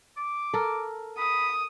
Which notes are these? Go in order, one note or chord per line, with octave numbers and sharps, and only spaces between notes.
D6
A4 A#4
B5 D#6